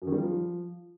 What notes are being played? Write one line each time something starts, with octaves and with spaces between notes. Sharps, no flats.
F#2
D#3
G3
F3